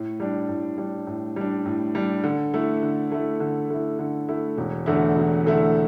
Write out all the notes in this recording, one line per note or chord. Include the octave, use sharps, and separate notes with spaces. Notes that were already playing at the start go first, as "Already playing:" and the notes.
Already playing: A2
G3 D4
A2
G3 D4
A2
G3 D4
A2
G3 D4
D3
A3 E4
D3
A3 E4
D3
A3 E4
D3
A3 E4
E1
E2 D3 A3 E4
E1
E2 D3 A3 E4